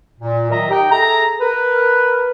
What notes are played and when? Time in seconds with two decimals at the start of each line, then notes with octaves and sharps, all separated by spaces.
0.20 A#2
0.50 D#3 F#3 A#4 D#5 E5 A#5
0.70 D#4 G4 G5
0.91 G#4 A4 E5 A#5
1.41 A#4 B4